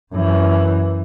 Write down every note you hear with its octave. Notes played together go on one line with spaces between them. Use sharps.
F#2 E3